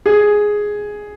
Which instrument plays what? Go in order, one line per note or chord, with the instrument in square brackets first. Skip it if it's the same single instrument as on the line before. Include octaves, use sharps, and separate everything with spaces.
[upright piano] G#4